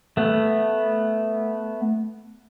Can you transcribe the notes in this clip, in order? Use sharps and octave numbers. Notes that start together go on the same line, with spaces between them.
A3 B3